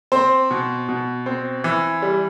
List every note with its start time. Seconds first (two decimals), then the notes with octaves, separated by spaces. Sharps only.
0.12 C4 C5
0.51 B2
0.89 B2
1.26 C4
1.64 E3
2.02 G3